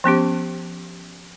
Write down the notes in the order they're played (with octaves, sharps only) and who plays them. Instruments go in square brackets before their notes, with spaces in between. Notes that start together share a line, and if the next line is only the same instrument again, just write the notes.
[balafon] F3 B3 C#4 G4